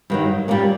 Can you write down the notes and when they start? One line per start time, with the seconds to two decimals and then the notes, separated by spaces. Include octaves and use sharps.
0.10 G2 D#3 F#3
0.48 A#2 G3 A#3 C#4